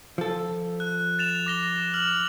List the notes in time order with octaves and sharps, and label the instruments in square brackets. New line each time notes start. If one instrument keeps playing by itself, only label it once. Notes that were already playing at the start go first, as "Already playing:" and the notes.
[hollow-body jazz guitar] F3 A4
[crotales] F#6
A6 E7 F7
D6 A#6 G7
F6 F#7